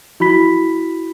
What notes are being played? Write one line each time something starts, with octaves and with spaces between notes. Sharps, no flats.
E4 F#4 B5 B6